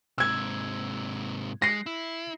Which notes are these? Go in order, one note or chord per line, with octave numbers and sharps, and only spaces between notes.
G#2 C3 E6 G#6
G#3 A#6 C7
E4